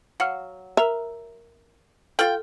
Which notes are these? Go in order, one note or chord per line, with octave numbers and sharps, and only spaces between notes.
F#3 F5 F#5 F6
A#4 E5 A#5 E6
F4 A4 G5 F6 F#7